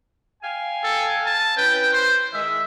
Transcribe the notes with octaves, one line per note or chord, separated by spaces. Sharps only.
F5 G5 G#5
A4
A5
C#4 E4 B4 G5
C5
D#3 G#3 E5